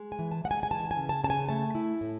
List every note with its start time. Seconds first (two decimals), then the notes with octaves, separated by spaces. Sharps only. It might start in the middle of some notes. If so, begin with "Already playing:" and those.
Already playing: G#3
0.12 G#5
0.19 E3
0.31 A5
0.44 G#3 F#5
0.51 G#5
0.63 G#5
0.71 E3 A5
0.91 G#5
0.97 C#3
1.09 A5
1.24 C#3 A5
1.30 G#5
1.49 A3 A5
1.75 E4
2.01 A2